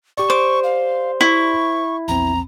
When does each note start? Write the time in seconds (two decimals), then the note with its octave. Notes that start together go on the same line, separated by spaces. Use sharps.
0.17 G4 D5 C#6
0.30 C5 D6
0.63 F5
1.21 E4 C#6
2.08 A#1 E2 C4 A#5